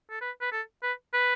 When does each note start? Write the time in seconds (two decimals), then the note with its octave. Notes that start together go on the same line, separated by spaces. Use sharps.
0.10 A4
0.21 B4
0.41 B4
0.52 A4
0.83 B4
1.13 B4